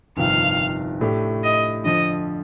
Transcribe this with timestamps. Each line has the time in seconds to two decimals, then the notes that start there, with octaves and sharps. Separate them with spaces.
0.17 G1 F2 C3 D#3 F5
1.01 A2 A3 D4 G4
1.43 D#5
1.84 F2 D3 F3 D#5